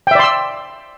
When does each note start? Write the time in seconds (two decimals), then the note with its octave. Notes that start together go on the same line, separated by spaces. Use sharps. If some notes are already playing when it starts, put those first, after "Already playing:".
0.07 G5
0.11 E5
0.15 D5
0.19 C6
0.24 E6